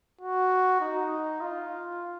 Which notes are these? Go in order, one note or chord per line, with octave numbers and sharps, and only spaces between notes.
F#4
D#4
F4